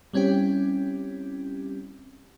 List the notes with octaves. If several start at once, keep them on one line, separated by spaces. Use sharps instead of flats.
G3 C4 C#4 E4 G4